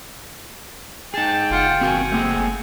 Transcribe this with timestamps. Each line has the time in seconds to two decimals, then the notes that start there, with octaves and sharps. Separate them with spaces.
1.14 D#4 G#4 G5 A5
1.50 F#1 F4 F#5
1.81 C4 F#4 A#4 F#5 G#5
2.12 A3 A#3 C4 G#4